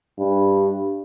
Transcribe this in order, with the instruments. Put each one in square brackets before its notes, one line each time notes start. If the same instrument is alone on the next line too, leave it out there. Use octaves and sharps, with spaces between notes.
[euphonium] G2